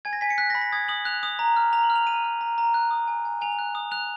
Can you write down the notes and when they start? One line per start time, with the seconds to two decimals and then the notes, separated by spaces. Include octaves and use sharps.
0.05 G#5 G#6
0.13 A#6
0.21 G#5 B6
0.30 C#7
0.38 F#6 B6
0.50 A#6
0.55 B5
0.61 A#6
0.72 D#6 G#6
0.88 D#6 F#7
1.05 F#6 F7
1.23 D#6
1.39 A#5
1.56 F6
1.73 A#5 F7
1.84 F#7
1.90 F6
1.96 F7
2.07 A#5 D#7
2.24 F6
2.41 A#5
2.58 A#5
2.74 F#6
2.91 D#6
3.07 G#5
3.25 G#5
3.41 G#5 F7
3.52 F7
3.59 F#6
3.75 D#6
3.91 F#6 F7